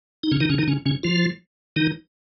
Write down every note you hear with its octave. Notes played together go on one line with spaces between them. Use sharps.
D#4
C#3 C#4
D#3 D#4
C#3 C#4
D#3 D#4
C#3 C#4
C#3 C#4
F3 F4
D#3 D#4